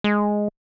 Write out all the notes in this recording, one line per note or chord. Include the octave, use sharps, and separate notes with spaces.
G#3